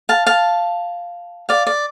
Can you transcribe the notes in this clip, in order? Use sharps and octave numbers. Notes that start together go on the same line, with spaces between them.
F5 A5
F5 A5
D5 F5
D5